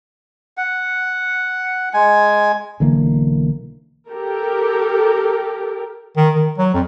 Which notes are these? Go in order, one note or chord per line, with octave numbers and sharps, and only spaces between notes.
F#5
G#3 G#5
B1 D3 E3 A#3
G4 A4 A#4
D#3
D#3
F#3
F2